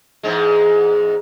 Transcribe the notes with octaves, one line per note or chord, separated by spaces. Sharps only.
E2 G#2 G#3